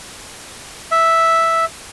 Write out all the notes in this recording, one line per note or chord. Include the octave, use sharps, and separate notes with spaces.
E5